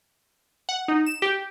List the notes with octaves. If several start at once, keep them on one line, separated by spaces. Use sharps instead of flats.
F#5
D#4
E7
G4